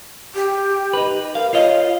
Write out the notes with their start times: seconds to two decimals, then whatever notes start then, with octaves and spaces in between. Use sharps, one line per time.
0.35 G4
0.93 D#4 B4
1.35 A#4 F5
1.53 F4 C#5 D#5 F5